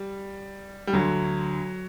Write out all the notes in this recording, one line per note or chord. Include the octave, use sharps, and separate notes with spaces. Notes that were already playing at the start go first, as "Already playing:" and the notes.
Already playing: G3
G3
D2 D3 F#3